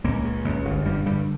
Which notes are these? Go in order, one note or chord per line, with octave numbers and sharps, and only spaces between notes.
C#2 A#2 A#3
C#3
C#2
G1
G2 D3 G3
G2 D3 G3